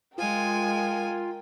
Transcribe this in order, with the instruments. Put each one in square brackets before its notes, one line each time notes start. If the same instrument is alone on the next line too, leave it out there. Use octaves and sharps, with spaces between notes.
[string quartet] G#3 [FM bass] F4 [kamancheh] A#4 G5 [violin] G#5